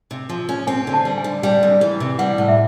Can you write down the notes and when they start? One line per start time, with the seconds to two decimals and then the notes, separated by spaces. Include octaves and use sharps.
0.11 C3
0.29 F3
0.49 C#4
0.67 C4 G#5
0.87 D3
0.93 A5
1.05 G3
1.18 G#5
1.24 D3
1.43 G3 G5
1.63 C3
1.81 E3
2.00 C3
2.19 G3 F#5
2.38 A2
2.48 E5